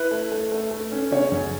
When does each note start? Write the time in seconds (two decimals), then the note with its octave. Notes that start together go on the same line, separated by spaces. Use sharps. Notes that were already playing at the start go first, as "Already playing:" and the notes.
Already playing: E4 B4
0.11 A3
0.32 A3
0.52 A3
0.71 A3
0.92 C#4
1.12 C#3 C#5
1.32 F#2